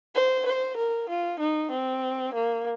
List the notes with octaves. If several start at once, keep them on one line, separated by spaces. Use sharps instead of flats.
C5
C5
A#4
F4
D#4
C4
A#3